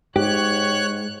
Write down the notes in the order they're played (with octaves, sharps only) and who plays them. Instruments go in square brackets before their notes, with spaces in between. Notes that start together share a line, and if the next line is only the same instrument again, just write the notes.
[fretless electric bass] G#2 [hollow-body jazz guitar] G4 [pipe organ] C#5 F#6